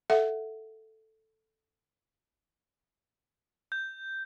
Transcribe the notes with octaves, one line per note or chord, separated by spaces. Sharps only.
A4 E5 F#5
G6